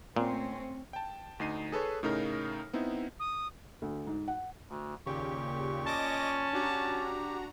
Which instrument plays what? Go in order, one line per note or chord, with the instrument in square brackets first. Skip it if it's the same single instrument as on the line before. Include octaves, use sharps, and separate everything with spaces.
[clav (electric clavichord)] A#2 [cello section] A3 C4 C#4
[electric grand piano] G5 A5
D2 D#4 C7 D#7
G#4 A4 B4 C#5
A2 C#3 D#4 A#4 F6 A#6
B3 C4 D#4 E4
[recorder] D#6
[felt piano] D2
G#2
F#5
[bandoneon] D2
[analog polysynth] D#2 C#3 G4 [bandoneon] A#2 C#6
[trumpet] C#4 [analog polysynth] D#5 D6 A#6 [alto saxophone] A5
[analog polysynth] D4 F#4 A#5 [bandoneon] G4